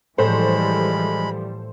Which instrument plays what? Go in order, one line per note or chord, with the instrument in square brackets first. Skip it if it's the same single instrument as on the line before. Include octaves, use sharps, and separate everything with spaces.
[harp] A2 [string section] E3 F3 G3 [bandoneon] G#3 B5 [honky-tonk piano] A4 C5